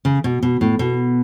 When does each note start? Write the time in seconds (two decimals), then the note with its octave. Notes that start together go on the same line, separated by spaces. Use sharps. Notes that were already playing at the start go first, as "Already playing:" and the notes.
0.05 C#3
0.24 B2
0.43 B2
0.61 A2
0.79 B2